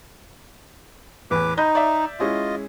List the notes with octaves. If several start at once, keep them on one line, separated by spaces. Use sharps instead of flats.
E2 A2 B4 D6
D#4 D#5 B5 G6
D5 E5
G#3 C#4 E4 F4 D#5